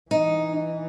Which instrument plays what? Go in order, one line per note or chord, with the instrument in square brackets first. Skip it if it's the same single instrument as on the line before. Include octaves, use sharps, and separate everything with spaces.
[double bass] E3 [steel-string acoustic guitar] D#4